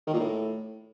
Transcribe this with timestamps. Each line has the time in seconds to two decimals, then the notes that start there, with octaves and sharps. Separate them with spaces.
0.07 D#3
0.13 A#2
0.20 A2